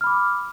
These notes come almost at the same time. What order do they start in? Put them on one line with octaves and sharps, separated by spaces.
F6 B5 D6